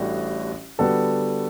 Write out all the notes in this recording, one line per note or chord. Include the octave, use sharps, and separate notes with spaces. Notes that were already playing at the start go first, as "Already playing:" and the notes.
Already playing: A1 A2 G3 D4 F#4
D3 G3 B3 F#4 A4